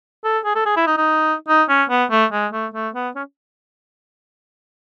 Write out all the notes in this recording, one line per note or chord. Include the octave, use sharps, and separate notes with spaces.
A4
G#4
A4
G#4
E4
D#4
D#4
D#4
C#4
B3
A3
G#3
A3
A3
B3
C#4